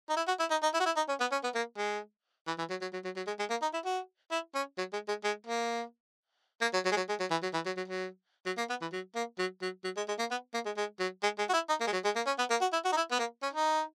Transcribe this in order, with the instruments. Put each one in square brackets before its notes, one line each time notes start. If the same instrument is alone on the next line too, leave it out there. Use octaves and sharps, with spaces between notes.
[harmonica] D#4
E4
F#4
E4
D#4
D#4
E4
F#4
E4
D#4
C#4
B3
C#4
B3
A#3
G#3
E3
E3
F#3
F#3
F#3
F#3
F#3
G#3
G#3
A#3
D#4
E4
F#4
E4
C#4
F#3
G#3
G#3
G#3
A#3
A#3
F#3
F#3
G#3
F#3
G#3
F#3
E3
F#3
E3
F#3
F#3
F#3
F#3
A#3
B3
E3
F#3
A#3
F#3
F#3
F#3
G#3
G#3
A#3
B3
A#3
G#3
G#3
F#3
G#3
G#3
F#4
E4
D#4
A#3
G#3
F#3
G#3
A#3
C#4
B3
A#3
F#4
E4
F#4
D#4
E4
B3
A#3
C#4
D#4